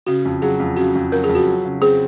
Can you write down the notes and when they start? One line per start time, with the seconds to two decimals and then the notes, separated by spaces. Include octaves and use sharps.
0.07 C#3 F#4
0.25 F2
0.42 F#3 G#4
0.60 F2
0.76 C#3 F#4
0.95 F2
1.12 F#3 A#4
1.24 G#4
1.29 F2
1.35 F#4
1.47 F#3
1.65 C#3
1.81 C4 G#4